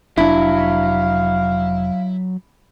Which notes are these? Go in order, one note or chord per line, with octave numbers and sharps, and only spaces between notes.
F1 F#3 D4 E4 F5